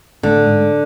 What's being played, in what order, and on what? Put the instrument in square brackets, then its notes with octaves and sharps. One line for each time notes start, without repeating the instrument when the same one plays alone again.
[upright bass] A2 [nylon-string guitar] D3
[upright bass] G#2